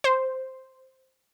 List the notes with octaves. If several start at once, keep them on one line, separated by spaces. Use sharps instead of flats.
C5